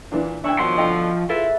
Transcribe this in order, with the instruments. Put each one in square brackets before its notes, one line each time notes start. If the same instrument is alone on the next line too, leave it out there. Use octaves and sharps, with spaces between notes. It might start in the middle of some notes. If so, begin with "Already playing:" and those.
[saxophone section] A#2 [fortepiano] E3 D4
[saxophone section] E3 E4 [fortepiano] D4 G5 [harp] C#6 E6 G#6
[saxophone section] B2 D#3 F#3 [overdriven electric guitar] F3 C6
[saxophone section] B2 D3 F4 [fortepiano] D#5 G5
[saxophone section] E4 F4 [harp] A4 B4 E5